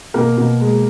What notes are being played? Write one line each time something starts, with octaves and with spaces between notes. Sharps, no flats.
B2 A#3 A#4
B2
G#3